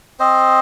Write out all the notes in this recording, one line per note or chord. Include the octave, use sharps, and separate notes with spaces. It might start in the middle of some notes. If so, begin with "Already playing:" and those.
C4 C5 D#5